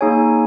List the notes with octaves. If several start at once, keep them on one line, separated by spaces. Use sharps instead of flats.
A#3 D#4 G#4 C#5 G#5